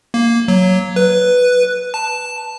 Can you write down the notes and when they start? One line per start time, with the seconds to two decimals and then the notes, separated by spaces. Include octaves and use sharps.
0.14 A#3
0.48 F#3
0.96 B4
1.94 A5